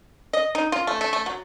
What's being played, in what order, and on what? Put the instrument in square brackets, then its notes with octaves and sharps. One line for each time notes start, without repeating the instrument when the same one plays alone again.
[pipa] D#5
D#4
F4
A3
A3
A3
F#3